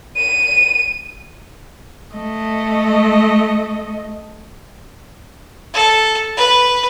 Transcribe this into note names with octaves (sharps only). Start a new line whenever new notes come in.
D#7
A3 D#5
A4
B4